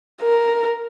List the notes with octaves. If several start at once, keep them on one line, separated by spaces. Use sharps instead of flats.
A#4